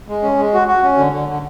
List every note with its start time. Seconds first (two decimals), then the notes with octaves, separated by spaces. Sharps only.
0.08 G#3
0.23 C#4
0.38 G#3
0.54 F#4
0.68 F#4
0.84 C#4
0.98 D3
1.13 D3
1.29 D3